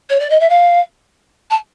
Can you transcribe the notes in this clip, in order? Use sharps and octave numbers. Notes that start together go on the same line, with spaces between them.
C#5
D5
D#5
E5
F5
A5